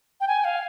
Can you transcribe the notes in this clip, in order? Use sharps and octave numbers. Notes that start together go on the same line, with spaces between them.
G5
G#5
F5